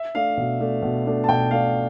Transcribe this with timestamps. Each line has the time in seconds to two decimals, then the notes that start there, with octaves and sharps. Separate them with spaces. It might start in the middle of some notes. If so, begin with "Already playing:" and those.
Already playing: E5
0.15 A3 D4 F5
0.37 B2
0.60 A3 D4
0.82 B2
1.06 A3 D4
1.24 A5
1.29 B2 G5
1.51 A3 D4 F5